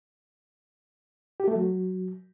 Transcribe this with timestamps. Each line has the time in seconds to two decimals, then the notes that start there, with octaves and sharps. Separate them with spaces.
1.40 G4
1.48 A3
1.56 F#3